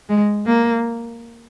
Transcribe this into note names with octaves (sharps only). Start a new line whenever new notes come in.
G#3
A#3